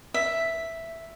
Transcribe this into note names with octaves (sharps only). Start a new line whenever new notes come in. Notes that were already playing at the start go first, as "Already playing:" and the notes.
E5